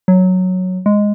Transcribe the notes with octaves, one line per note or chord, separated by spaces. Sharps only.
F#3
G#3